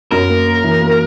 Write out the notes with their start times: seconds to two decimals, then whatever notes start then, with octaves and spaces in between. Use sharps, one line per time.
0.12 F#2 A#4
0.29 A#3
0.47 A#3
0.64 E3
0.81 A#3